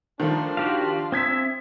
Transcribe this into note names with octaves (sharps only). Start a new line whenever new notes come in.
D#3 F3 A3 D4 F4
F#4 G4 F5
C4 E5 D#6 G#6 B6